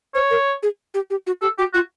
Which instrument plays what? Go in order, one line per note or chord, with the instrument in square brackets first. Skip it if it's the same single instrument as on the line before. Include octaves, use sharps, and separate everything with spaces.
[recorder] C5 [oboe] C#5
[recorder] A#4
G#4
G4
G4
F#4
[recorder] G4 [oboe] A4
[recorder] F#4 [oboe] G4
[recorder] F4 [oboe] F#4